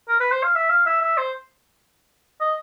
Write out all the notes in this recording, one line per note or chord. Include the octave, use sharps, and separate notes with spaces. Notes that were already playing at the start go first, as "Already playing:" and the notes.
A#4
B4
C5
F5
E5
F5
E5
E5
C5
D#5